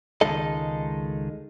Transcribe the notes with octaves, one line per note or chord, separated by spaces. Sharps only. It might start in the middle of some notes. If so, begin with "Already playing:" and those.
C#2 D#3 G#3 D#4 A4 D#5